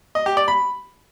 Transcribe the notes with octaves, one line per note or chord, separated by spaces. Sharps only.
D#5
G4
D5
B5